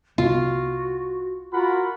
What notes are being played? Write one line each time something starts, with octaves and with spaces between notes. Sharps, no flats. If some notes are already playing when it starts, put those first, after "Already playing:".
C2 C3 B3 F4 F#4
F4 F#4 A#4 F#5 B5